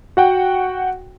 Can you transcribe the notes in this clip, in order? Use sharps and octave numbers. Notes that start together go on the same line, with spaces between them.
F#4 F#5 G5